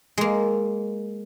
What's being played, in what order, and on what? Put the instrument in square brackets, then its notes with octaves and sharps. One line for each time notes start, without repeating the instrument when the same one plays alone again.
[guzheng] G#3 A#3